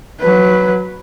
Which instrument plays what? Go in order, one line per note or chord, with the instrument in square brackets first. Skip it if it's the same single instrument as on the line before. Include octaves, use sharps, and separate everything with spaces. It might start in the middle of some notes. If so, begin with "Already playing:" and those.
[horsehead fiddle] F#3 B4